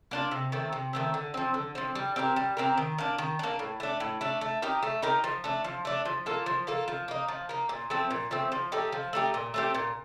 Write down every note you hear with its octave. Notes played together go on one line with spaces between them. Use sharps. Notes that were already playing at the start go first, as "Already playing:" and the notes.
A#3 D4 F4
C3
D#3 A3 C4
C3
D#3 A3 C4
D3
F3 C4
D3
F3 C4
G3
C4 G4 A#4
G3
C4 G4 A#4
D#3
A#3 D4
D#3
A#3 D4
A2
A3 D4
A2
A3 D4
A3
D#4 G4 A#4
A3
D#4 G4 A#4
F3
A3 D4
F3
A3 D4
F3
A#3 F4 A4
F3
A#3 F4 A4
F3
A#3 D#4
F3
A#3 D#4
A#2
F3 A3 C4
A#2
F3 A3 C4
F3
A3 D#4 G4
F3
A3 D#4 G4
A#2
A3 C4 G4
A#2